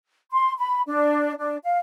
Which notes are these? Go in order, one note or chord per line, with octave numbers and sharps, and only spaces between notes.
C6
B5
D4
D4
F5